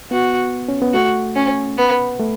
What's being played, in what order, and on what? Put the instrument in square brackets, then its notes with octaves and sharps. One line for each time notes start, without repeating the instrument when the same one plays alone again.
[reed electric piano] B3 [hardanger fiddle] F#4
[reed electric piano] C#4
B3
[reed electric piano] A3 [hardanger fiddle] F#4
[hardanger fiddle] C#4
B3
[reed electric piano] A3